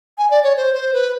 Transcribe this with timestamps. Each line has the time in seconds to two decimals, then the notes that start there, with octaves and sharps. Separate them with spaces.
0.18 G#5
0.31 D5
0.44 C#5
0.57 C5
0.74 C5
0.94 B4